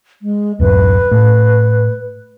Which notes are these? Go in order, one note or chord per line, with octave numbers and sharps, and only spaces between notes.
G#3
D1 F#2 B4
A2